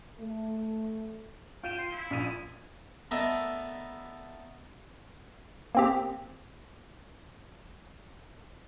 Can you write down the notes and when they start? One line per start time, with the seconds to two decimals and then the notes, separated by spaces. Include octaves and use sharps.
0.19 A3
1.63 F4 G5 D#7 E7
1.78 C6
1.92 E4
2.11 A#1 F4 D#7
3.11 A3 B3 A4 A#4 D5 D#5
5.75 A#3 C4 G4